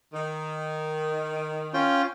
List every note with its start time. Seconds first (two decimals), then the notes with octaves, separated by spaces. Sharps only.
0.14 D#3
1.74 C#4 F4 G5